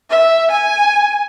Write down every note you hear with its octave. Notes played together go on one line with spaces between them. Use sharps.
E5
G#5